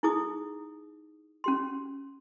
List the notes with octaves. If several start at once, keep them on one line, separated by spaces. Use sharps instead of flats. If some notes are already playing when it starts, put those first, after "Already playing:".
D#4 E4 G#4 D6 D#6
C#4 G4 C6